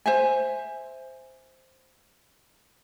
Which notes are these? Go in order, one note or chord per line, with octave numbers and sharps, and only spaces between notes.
C5 E5 G#5